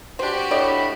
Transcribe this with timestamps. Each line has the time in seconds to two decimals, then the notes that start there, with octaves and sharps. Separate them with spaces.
0.19 D4 F#4 G4 C5
0.51 A2 C4 D4 D5 D#5 B5